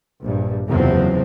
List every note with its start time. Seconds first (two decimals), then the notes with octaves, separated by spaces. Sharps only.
0.22 A#1 G2
0.69 F#1 E2 C3 F3 F#3 C4